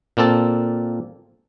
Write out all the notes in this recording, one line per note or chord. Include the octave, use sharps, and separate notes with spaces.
A#2 A#3 C4 A4 A5